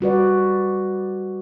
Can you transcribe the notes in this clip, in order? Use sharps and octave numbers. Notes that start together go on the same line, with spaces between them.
G3 F#4 B4 D5